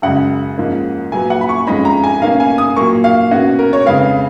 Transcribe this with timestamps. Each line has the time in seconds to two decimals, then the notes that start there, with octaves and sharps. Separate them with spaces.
0.02 F#2 C#3 G#3 F#5
0.57 G#2 F3 A#3 C#4
1.12 A#2 F#3 B3 G#5
1.30 F#5
1.41 B5
1.49 C#6
1.67 F2 F3 G#3 C#4 B5
1.85 A#5
2.04 G#5
2.21 B2 A#3 C#4 F5
2.40 G#5
2.58 D#6
2.76 A#2 F#3 A#3 C#6
3.04 F5
3.31 B2 A#3 C#4 F#4
3.59 A#4
3.73 C#5
3.85 F2 C#3 G#3 B3 F5